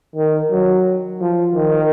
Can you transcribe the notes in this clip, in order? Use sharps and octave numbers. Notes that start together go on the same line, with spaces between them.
D#3
F#3
F3
D#3